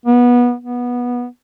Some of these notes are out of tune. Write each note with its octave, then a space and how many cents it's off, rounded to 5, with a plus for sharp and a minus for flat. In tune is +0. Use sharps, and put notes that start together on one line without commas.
B3 -20
B3 -15